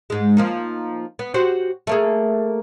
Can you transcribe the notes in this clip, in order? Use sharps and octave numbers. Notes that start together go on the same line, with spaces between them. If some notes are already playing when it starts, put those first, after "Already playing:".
G#2 G#3
F3 A#3 D#4
B3
F#4 G4 C5
A3 A#3 G#4